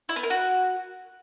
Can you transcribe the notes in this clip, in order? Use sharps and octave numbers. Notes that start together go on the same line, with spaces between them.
E4
B3
A#4
F#4